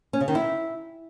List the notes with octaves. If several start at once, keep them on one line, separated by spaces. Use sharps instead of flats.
C#4
C#3
D#3
E4